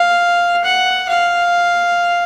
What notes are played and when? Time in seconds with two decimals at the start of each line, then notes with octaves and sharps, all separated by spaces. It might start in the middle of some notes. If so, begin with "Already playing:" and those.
Already playing: F5
0.64 F#5
1.09 F5